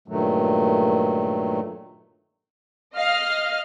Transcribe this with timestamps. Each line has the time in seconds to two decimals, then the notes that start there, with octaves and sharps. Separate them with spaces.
0.08 G2 A#2 D#3 F#3 A3
2.95 D#5 F5 F6